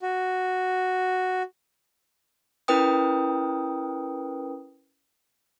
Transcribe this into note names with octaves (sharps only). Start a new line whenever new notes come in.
F#4
C#4 E4 A#4 B4 G5 D#6